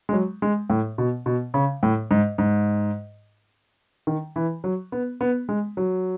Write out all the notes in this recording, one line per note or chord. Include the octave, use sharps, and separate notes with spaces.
G#3
F#3
G#3
A2
B2
B2
C#3
A2
G#2
G#2
D#3
E3
F#3
B3
B3
G#3
F#3